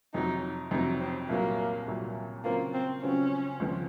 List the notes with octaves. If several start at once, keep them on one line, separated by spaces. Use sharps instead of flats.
F2 C3 F#3 D#4
F2 C3 F#3 D#4
C4
C2 A#2 F#3 A#3
C2 A#2 F#3
C#3 F#3 A#3 C4 F4
C4
C#3 F#3 C4 C#4 F4
C#2 C#3 F3 C4 F4